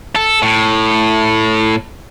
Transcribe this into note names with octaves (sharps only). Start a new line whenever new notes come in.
A4
A2